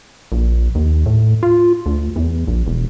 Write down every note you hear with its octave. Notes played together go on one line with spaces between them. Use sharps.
A#1
D#2
A2
F4
D2
E2
A#1
E1